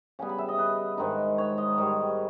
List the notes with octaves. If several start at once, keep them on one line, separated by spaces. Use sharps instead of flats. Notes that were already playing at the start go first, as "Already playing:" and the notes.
C#3 G3 B3 G#5
B5
E5
D#5
B4
G#2 D#3 G#3 D#4
C#5
D#5
G#2 D#3 G3